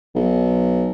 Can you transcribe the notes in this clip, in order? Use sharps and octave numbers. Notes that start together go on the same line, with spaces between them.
B1